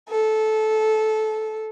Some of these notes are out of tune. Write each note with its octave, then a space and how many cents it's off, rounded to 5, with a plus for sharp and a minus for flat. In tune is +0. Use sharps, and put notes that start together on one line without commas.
A4 -15